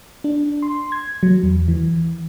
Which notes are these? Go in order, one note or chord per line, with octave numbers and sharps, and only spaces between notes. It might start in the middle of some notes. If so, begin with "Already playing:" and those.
D4
C6
G#6
F#3
E2
E3